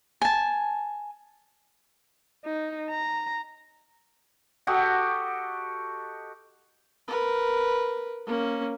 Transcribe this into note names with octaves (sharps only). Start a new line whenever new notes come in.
G#5 A5
D#4
A#5
F#4 G4 A4 D#5
A#4 B4
A#3 C#4